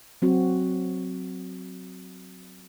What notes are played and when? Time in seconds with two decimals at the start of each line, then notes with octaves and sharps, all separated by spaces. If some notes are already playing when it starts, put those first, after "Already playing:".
0.22 F#3 C4 F#4